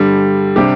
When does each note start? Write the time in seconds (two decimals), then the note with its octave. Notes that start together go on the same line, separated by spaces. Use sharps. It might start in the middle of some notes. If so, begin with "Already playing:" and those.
Already playing: G2 D3 G3
0.56 C3 G3 D4 G4